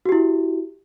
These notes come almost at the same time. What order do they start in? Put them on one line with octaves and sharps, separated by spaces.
F#4 G4 E4